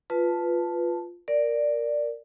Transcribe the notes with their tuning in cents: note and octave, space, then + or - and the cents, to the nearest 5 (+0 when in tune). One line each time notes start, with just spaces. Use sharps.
F4 +0 B4 +0 A5 +0
A#4 +0 D5 +0